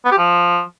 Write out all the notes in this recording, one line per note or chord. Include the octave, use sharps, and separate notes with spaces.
B3
G4
F3